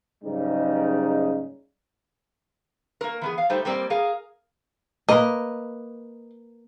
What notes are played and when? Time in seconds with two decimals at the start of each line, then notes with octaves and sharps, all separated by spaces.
0.24 F#1 G#2 C#3 G3 D#4
3.01 A#3 A#4
3.22 E3 B3 G#4
3.38 F5
3.50 G3 A3 D#4 G4 A4 C5
3.65 G3 A#3 C4 A#4 D5
3.90 G#4 A#4 F5
5.09 A#3 B4 D#5